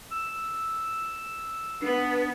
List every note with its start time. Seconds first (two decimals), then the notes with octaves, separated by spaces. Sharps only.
0.12 E6
1.82 B3 D4